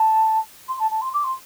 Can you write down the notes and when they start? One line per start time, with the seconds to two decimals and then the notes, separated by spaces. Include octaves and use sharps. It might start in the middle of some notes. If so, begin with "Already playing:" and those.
Already playing: A5
0.68 C6
0.79 A5
0.90 A5
1.01 C6
1.13 D6
1.24 C6